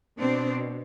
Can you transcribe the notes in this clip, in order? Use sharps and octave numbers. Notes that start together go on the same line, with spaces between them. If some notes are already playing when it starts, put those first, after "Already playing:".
B2 C4 D4